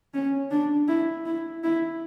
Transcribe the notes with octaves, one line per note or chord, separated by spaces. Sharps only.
C#4
D4
E4
E4
E4